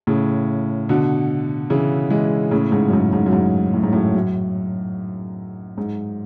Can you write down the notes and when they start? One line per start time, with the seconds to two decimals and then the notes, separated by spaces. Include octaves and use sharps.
0.07 A2 C#3
0.89 B2 D3
1.70 C#3 E3
2.10 E3 G#3
2.51 A2 C#3
2.72 G#2
2.89 F#2
2.93 G#2
3.13 G#2
3.26 F#2
3.32 G#2
3.74 A2
3.83 G#2
3.93 F#2 A2
4.15 F#2
5.78 G#2